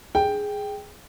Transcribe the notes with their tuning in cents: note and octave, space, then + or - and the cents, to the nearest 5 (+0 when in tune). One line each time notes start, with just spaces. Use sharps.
G#4 +0 G5 +0